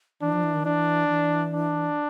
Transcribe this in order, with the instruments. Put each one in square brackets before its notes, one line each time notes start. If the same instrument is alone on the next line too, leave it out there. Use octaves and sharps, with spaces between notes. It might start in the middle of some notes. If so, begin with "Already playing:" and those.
[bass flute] E3 [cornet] D4
[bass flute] F3
E3
D#3
[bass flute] E3 [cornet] D4
[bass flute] E3
[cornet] D4